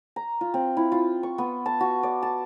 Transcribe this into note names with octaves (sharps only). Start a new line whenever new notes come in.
A#5
F4
C4
E4
F4
C#6
B3
A5
F#4
D5
A5